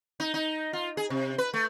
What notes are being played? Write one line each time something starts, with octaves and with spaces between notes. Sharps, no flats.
D#4
D#4
F4
G#4
C3
B4
A3